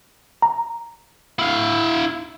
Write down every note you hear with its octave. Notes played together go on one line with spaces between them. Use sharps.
A#5
E4 F5